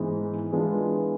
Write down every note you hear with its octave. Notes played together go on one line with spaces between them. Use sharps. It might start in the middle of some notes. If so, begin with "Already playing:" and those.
Already playing: G#2 E3 G#3 B3 D#4
E3 G#3 B3 D4 F4